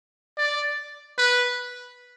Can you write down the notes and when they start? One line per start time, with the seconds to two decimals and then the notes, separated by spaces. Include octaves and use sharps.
0.38 D5
1.18 B4